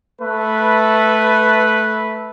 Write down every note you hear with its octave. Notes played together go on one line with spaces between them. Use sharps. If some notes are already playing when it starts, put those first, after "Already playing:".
A3 B4